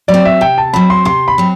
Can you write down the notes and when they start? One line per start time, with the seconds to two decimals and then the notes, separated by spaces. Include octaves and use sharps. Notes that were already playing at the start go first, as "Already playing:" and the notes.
0.08 F#3 D5
0.14 C4
0.26 E5
0.41 C3 G5
0.58 A5
0.73 F#3 C4 B5
0.90 C6
1.05 C3 C6
1.28 B5
1.38 F#3 C4